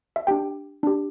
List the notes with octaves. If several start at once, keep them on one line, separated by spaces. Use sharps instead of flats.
E5
D4 G4 G5
D4 G4